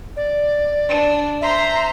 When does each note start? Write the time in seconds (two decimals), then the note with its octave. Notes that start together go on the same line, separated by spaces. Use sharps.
0.16 D5
0.89 D4
1.41 C5 E5 A#5 C6